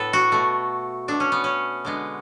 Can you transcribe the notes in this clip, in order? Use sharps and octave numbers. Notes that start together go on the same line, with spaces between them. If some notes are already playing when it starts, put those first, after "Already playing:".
Already playing: A2 B3 A4 B4
F#4
B2 A3
B2 A3 D4
C#4
B3
C#4
D3 G#3 B3